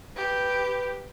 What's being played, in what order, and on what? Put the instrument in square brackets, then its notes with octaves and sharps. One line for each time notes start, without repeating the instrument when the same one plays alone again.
[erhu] G4 [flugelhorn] B4